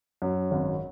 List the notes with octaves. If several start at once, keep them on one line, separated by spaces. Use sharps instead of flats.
F#2
G#1